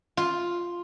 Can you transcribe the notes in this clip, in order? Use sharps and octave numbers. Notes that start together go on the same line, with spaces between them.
F4